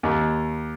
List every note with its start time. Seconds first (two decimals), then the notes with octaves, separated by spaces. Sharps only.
0.03 D#2